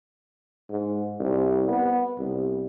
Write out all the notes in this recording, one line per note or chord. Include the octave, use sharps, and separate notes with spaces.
G#2
C2
B3
C2